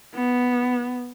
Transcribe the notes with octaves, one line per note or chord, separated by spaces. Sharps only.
B3